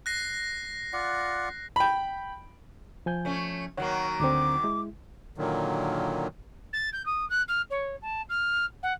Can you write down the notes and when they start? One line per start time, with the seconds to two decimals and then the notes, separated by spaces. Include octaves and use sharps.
0.06 F#6 A#6 C7
0.93 F4 D5 F#5
1.76 G5 B5
3.06 F3 G#5 G6
3.25 A3 C#4
3.77 D#3 F#3 A#3 C#5 F#5
4.20 D2 D3 C4 D6
4.64 G#3 E4
5.38 A#2 D3 D#3 F#3
6.73 A6
6.93 G6
7.06 D#6
7.30 F#6
7.48 F6
7.70 C#5
8.02 A5
8.29 F6
8.83 F#5